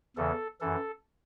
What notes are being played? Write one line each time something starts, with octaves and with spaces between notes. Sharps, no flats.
E2 C#3 E3 A4
F#2 E3 A4